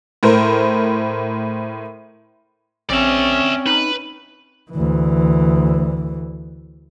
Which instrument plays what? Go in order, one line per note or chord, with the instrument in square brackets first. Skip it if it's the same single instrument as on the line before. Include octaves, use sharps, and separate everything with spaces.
[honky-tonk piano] A2 A#4 C5
[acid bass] A#1 [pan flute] C4 [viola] C#4 [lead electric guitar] D5 E5
[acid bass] D#4 [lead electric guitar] B4
[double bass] D2 E3